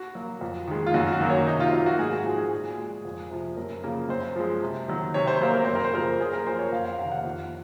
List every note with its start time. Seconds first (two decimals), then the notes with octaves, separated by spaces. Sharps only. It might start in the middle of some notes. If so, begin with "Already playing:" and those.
Already playing: F#4
0.15 F#3 A#3
0.41 F2
0.68 D#3 G#3
0.86 F4
0.94 F#2 F#4
1.12 F#4
1.20 D#3 F#3 A#3
1.30 C#5
1.47 C3 D#4
1.60 F4
1.73 F#3 A#3 F4
1.86 F#4
1.99 G#2 G#4
2.13 F#4
2.25 F3 G#3
2.38 G#4
2.52 A#2
2.78 G#3
3.05 F2
3.30 C3 F3
3.57 F#2 A#4
3.83 C#3 F3 A#3
4.09 F#2 C5
4.36 F3 G#3
4.62 C3
4.88 D#3 F#3
5.14 C3 C#5
5.27 C5
5.41 F#3 A#3 C5
5.54 A#4
5.65 F#2 C5
5.75 A#4
5.85 C5
5.93 C#3 F3 A#3 A#4
6.20 F#2 G#4
6.33 A#4
6.46 F3 A#3 C5
6.59 C#5
6.72 F2 F5
6.85 F5
6.99 C3 D#3 F5
7.11 F#5
7.24 F2